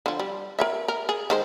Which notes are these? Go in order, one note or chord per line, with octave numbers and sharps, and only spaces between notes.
D3 F3
G3
A#4 C#5 E5
A#4
G#4
D#3 G#3 C5